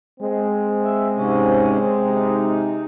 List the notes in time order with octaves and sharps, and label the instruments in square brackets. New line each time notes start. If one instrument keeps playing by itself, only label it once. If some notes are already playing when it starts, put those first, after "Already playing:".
[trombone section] G#3 C4
[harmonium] E5
G#2 C3 C#4
C3 D#4